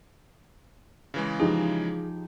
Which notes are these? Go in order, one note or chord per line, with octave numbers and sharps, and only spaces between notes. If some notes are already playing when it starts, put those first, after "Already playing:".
C#3 E3 G#3
F3 D#4 G4 G#4